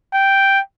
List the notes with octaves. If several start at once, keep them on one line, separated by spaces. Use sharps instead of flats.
G5